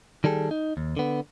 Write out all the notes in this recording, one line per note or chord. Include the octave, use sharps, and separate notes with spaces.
D#3 G3 G#4 A4
D#4
D#2
D3 B3